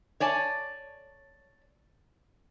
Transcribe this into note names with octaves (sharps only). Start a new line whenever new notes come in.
C#5 D5 G#5 A5